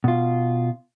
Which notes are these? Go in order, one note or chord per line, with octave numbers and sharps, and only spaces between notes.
B2 F4